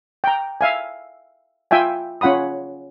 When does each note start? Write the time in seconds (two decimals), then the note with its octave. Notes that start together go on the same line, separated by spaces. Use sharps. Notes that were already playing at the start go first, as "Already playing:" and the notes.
0.24 G5 A#5
0.61 E5 F5 G#5
1.71 F4 E5 G5 G#5
2.21 C#4 F4 F#5 B5 D#6